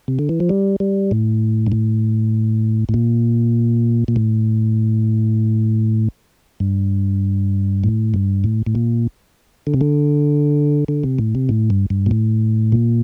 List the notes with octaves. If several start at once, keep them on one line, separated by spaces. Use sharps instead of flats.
C3
D3
E3
F3
G3
G3
A2
G2
A2
A2
A#2
A#2
A2
G2
A2
G2
A2
A2
A#2
D3
C3
D3
D3
C3
A2
C3
A2
G2
G2
A#2
A2
A#2